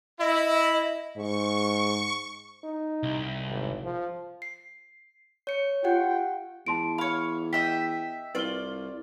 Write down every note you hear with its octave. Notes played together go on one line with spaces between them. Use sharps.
E4 D#5
G#2 C#6
D#4
C2
G#1
F3
C7
C#5 C#7
F4 G4 F#5 G5
E2 A5 C6 D7
C#5 F5 B5
D#5 E5 G5 B6
C2 F4 B4 D5 G7